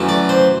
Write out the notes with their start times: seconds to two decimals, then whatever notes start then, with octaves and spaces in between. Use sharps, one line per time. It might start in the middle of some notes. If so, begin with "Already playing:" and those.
Already playing: F#2 E3 A3
0.09 D5
0.29 C5